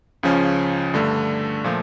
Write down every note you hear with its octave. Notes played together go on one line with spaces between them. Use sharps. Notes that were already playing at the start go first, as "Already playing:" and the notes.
C#2 C#3 F3 C#4
G2 D3 A3
A#2 F3 A3